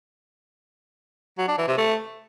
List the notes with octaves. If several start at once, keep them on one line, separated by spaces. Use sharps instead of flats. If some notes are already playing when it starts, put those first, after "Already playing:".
F#3
D4
E3
C3
A3